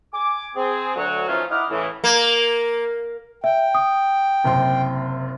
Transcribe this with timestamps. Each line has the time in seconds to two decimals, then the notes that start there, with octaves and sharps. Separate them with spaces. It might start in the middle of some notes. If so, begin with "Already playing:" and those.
0.13 G#5 D6
0.56 C4 G#4
0.96 D2 F#3 F#4 C#5
1.29 E3 F3 A3 C#4 D#4 F4
1.50 D#4 E4 D#5 F#5 D6 F6
1.69 A2 C#3 E3
2.04 A#3
3.44 E5 G5
3.75 D#6
4.44 F#1 C3 C6